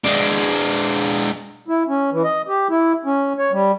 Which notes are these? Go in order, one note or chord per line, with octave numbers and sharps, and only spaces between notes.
G#3 D4
E4
C#4
E3
D#5
G4
E4
C#4
C#5
G3